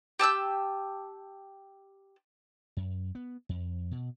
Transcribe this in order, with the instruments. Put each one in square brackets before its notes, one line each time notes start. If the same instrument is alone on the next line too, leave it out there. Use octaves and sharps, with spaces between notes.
[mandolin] G4 A5 E6 G6
[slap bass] F#2
B3
F2
B2